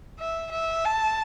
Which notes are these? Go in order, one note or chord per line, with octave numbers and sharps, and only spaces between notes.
E5
E5
A5